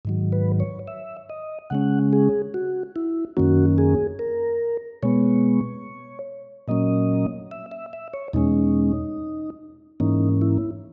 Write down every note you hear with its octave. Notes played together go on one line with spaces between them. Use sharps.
G#2 D#3 F#3
B4
C#5
E5
D#5
C#3 G#3 C#4 F#5
G#4
F#4
E4
F#2 D#3 A#3 C#4 F#4
G#4
A#4
B2 G#3 B3 C#5
A#2 F#3 A#3 C#4 D#5
E5
E5
E5
C#5
E2 B2 G#3 C#4 D#4
G#2 E3 A#3 C#4 D#4
E4